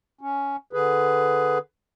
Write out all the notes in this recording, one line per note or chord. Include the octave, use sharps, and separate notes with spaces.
C#4
D3 G#4 B4